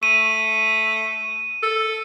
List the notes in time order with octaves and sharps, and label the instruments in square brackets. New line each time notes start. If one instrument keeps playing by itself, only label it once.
[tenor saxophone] A3 [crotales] D#7
[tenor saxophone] A4